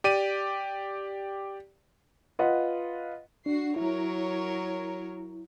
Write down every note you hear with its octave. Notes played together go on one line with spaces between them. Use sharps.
G4 D5 D#7
F4 B4 D#5 F#5
D4 F#4 C7
F#3 E4 A#4 C#5